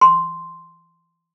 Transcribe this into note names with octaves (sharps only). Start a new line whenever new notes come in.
C6